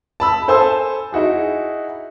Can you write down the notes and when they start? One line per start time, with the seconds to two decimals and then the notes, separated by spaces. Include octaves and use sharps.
0.20 A5 B5 E6
0.48 A4 C5 G#5 A5 C6 E6
1.13 D#4 E4 F#4 G#4